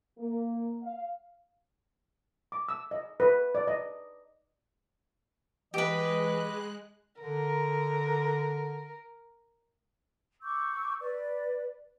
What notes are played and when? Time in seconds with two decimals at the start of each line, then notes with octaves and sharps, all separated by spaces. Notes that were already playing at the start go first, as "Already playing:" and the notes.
0.18 A#3
0.83 F5
2.52 D6
2.69 E6
2.91 D#5
3.20 B4
3.55 D5
3.67 D#5
5.74 E3 G#3 G4 B4 D#5 F#6
7.20 D3 A#4
10.43 C#6 D6 E6 G6
11.01 B4 D5